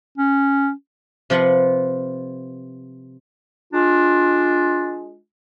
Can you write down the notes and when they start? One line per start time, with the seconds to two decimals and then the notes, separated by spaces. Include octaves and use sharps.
0.18 C#4
1.30 C3 F3 F4 B4 F#5
3.72 G#3 D4 F4